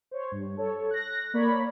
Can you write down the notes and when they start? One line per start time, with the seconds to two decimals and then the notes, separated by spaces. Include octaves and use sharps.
0.11 C5 C#5
0.31 G2
0.57 A4 C#5
0.91 F#6 A#6
1.34 A#3 A#4 C#5 D5 B5